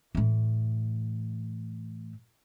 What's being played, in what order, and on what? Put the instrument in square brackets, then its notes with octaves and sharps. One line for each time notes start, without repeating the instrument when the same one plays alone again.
[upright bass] A2 E3